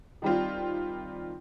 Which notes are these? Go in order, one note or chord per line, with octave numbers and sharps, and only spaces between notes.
D#3 G3 C4 F4